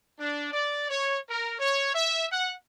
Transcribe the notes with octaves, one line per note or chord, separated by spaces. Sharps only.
D4
D5
C#5
A#4
C#5
E5
F#5